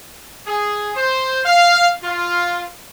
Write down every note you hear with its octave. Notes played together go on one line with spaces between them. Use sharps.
G#4
C5
F5
F4